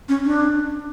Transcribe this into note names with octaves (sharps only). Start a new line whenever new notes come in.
C#4
D4